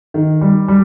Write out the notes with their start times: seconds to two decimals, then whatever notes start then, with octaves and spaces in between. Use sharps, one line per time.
0.14 D#3
0.41 G3
0.68 G3